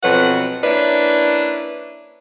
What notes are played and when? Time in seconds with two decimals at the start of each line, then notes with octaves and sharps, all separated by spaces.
0.03 F2 B2 F#3 B4 F#5
0.64 A#3 C#4 D4 E4 B4